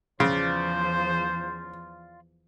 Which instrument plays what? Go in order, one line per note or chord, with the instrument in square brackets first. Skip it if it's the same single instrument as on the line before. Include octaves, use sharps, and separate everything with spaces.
[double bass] E2 F3 [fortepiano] C#3 [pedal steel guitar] F4 D5 [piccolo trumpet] C5